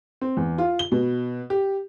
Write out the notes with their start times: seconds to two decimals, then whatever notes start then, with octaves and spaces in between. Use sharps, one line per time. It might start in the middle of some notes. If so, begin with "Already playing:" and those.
0.21 C4
0.37 E2
0.58 F4
0.79 G7
0.92 B2
1.50 G4